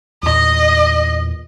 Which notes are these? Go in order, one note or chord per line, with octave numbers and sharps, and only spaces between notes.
E2 A#2 D#5